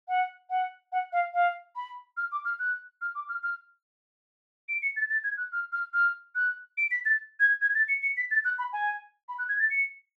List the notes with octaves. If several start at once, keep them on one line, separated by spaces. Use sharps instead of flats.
F#5
F#5
F#5
F5
F5
B5
F6
D6
F6
F#6
F6
D6
F6
F6
D7
C#7
A6
A6
G#6
F#6
F6
F6
F6
F#6
D7
B6
A6
G#6
G#6
A6
C#7
C#7
B6
A6
F#6
B5
G#5
B5
F#6
G#6
A6
C#7